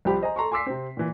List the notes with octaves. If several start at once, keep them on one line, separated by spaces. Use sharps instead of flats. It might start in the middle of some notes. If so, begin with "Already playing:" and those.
C2 F3 G4 B5
C5 D#5 G#5 A#5
A4 A#5 C6 C#6
G#5 C6 D6 E6 B6 C7
C3 C4
A#2 E3